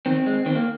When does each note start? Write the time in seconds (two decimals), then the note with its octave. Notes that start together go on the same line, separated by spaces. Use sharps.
0.06 D#3 C4
0.26 G#3
0.46 D#3 C4
0.55 A#3